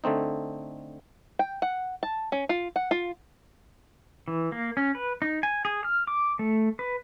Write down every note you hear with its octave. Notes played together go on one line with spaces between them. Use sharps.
D3 A3 C4 D#4
G5
F#5
A5
C#4
F4
F#5
F4
E3
A#3
C#4
B4
D#4
G#5
G#4
F6
D6
A3
B4